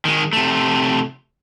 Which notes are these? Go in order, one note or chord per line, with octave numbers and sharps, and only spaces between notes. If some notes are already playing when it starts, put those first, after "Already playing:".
D#3 G#3
C3 A3